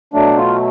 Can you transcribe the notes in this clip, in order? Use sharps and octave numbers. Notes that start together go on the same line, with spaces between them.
B2 F#3 A3 D4
F4